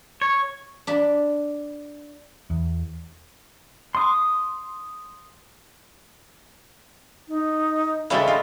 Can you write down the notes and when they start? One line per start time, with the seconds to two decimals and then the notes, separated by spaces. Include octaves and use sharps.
0.22 C#5
0.87 D4 B5
2.50 E2
3.95 C6 D#6
7.28 D#4
8.10 C#3 G3 G#3 E4 A4 B4
8.28 F4 D#5